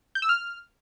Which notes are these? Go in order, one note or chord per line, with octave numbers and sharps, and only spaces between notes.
G6
E6
F6